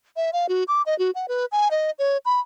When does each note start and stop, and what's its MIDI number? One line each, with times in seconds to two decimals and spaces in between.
0.16 0.31 76
0.33 0.47 77
0.49 0.64 66
0.68 0.82 86
0.86 0.97 75
0.99 1.11 66
1.15 1.26 78
1.28 1.45 71
1.52 1.68 80
1.71 1.91 75
1.99 2.17 73
2.25 2.40 83